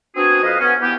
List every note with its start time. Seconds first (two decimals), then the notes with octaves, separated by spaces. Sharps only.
0.16 B3 C4 D4 F#4 G#4
0.43 F2 B4 D#5 F5
0.59 B3 C#4
0.81 E3 B3 G4